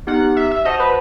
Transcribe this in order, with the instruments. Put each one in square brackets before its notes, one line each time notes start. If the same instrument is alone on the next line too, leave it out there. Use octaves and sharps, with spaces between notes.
[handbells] B3 D#4 G4 D#5 [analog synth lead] F#5
[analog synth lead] E5
E5
[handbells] F#4 C5 F#5 A5 [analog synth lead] D#5
[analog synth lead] B4